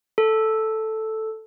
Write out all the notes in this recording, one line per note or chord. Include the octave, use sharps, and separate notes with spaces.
A4